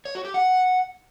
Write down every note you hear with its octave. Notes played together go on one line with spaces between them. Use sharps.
C#5
F#4
G4
F#5